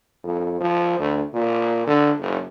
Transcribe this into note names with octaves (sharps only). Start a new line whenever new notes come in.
F2
F3
D2
A#2
D3
F#1